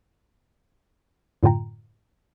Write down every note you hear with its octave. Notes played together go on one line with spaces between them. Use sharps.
F#2 A2 D3 F4 G5 A#5